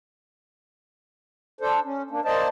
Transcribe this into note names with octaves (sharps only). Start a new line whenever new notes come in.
D4 A4 C5
C#4
A#3 D4
A#3 C5 D5 D#5 A5